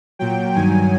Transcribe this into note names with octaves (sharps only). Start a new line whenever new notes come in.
A#2 F#3 G5
G2 D#3 F#3 G#5